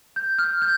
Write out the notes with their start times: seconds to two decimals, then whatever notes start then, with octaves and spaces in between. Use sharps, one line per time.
0.16 G6
0.39 F6
0.62 G6